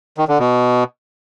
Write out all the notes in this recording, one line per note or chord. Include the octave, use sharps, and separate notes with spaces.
D#3
D3
B2